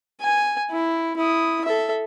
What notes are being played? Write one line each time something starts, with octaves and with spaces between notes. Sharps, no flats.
G#5
E4
E4 D#6
A4 E5